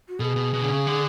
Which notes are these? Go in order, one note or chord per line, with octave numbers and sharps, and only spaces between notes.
F#4
B2 G#4 A4
B2
B2
D3
C#3
D3